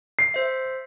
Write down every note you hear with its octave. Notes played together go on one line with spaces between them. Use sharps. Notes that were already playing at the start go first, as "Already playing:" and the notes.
C7
C5 E5